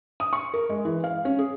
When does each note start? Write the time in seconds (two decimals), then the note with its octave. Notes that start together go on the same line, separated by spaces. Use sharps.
0.20 D#6
0.33 C#6
0.54 A#4
0.69 G#3
0.85 E3
1.04 F5
1.25 C#4
1.39 G#4